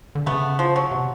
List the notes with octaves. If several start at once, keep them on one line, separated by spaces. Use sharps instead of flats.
D3
C#3 A3 B3
F3
F#3
C3